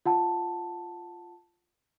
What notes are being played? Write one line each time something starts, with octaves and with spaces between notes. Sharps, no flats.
F4 F#5 A5